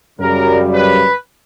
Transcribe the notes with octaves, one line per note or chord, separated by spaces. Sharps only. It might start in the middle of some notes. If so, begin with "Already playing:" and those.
F#2 C#3 G3 A#4
B4